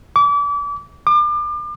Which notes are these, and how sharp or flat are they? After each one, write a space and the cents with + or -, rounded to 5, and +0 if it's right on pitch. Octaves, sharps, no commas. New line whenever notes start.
D6 -35
D6 +35